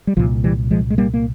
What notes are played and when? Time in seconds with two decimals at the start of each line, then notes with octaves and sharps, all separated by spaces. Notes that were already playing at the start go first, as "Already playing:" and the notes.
0.07 G3
0.17 C2 A#2 F3
0.44 E3 G3
0.71 F3 G#3
0.90 G#3
0.98 G3 A#3
1.14 A#3